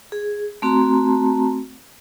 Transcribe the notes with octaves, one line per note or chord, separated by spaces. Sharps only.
G#4
A3 C4 F#4 A5 A#5 C6